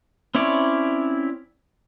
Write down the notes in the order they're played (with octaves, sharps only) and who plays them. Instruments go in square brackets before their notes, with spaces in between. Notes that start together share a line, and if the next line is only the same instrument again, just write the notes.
[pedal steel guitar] C4 C#4 E4 C#5 D5